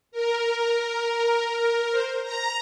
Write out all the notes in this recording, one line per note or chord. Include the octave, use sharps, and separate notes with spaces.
A#4
C5
A#5